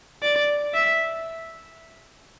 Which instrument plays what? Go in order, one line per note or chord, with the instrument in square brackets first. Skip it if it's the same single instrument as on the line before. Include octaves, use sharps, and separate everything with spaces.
[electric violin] D5
E5